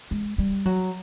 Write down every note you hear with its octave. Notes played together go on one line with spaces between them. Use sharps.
G#3
G3
F#3